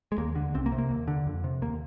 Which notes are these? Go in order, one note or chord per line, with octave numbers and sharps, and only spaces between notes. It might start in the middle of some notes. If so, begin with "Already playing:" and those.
G#3
D#2 A#3
D3
C2 C4
A#3
C3
A#3
D#2
D3
F2
C3
D#2 A#3